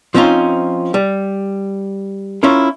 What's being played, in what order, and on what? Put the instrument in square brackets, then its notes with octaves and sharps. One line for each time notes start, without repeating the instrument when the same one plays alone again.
[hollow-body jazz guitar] F3 C4 C#4 D#4 F4
G3
C#4 E4 F4 A#4